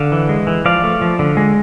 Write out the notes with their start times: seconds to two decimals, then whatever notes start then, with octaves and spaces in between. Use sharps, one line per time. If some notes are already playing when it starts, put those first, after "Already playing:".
Already playing: D3 F5
0.12 E3
0.29 G#3
0.47 E3
0.65 F3 D5 F5
0.84 A3
1.02 F3
1.19 D3
1.37 G#3